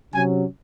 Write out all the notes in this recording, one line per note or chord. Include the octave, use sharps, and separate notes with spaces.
C3 F#3 C#4 G#5